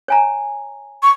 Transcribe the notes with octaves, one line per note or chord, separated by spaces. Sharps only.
C#5 G#5 A#5
C#6